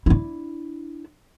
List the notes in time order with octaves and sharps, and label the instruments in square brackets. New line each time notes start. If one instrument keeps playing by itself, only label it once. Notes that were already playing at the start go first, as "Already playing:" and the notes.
[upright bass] D4 E4